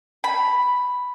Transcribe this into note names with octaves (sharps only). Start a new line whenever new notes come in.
B5